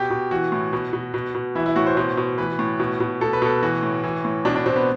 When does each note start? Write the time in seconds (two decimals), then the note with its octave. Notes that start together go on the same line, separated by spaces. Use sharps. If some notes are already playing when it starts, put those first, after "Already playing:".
Already playing: B2 G4
0.10 B2
0.31 E3 F#4
0.52 A2
0.73 B2
0.93 B2
1.14 B2
1.35 B2
1.55 E3 E4
1.66 E4
1.76 A2 F#4
1.87 C5
1.97 B2 C5
2.17 B2
2.38 E3 B4
2.59 A2
2.80 B2
3.00 B2
3.21 B2 A4
3.33 B4
3.42 B2 A4
3.62 E3 F#4
3.83 A2
4.04 E3
4.25 A2
4.45 B2 D4
4.56 D4
4.66 B2 C4
4.76 B3